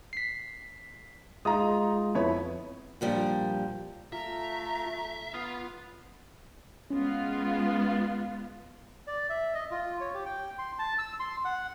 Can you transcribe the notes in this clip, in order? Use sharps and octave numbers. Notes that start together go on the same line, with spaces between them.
B6 C7
G#3 D#4 F4 A#5 D#6
F2 B3 E4 C#5
A#2 F3 G3 D4
A3 F4 E5 A#5
B3 F4 B5 D#6 F6
G#3 B3 C#4 F4
D5
E5
D#5
F4
C#5
G4
G5
C6
A5
E6
C6
F#5